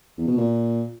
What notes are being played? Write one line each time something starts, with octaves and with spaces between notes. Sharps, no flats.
E2
B2
A#2